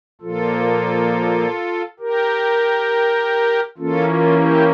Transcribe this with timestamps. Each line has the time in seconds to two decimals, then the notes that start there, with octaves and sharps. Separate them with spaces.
0.21 A#2 F3 A#3 F4 A4
1.99 G4 A#4
3.78 E3 A#3 C#4 F4 A4
4.07 F4
4.37 E4 G4